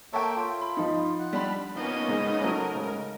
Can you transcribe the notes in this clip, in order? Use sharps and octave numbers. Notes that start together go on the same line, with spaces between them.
A#3 A4 C#5 E5 G5
F4
B5
F3 D#4
F#5
G3 D4 B5
F2 A#3 B3 C#4 D#4 D#5
G#2
F#3 A3 C#4 A#4
G#2 C#3